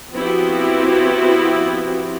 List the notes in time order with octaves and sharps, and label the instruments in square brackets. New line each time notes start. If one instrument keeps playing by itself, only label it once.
[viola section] F3 B3 C4 E4 F#4 G4